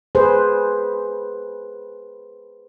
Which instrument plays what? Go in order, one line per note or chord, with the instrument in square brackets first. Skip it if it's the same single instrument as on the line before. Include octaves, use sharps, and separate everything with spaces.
[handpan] G#4 B4 C5